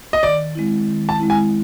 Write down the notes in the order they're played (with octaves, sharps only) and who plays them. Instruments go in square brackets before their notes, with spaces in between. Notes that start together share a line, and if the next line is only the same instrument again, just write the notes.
[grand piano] D#5
[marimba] D#3 [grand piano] D5
[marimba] G#3 C4 E4
D#3
[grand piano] A5
[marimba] G#3 C4 E4
[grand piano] G#5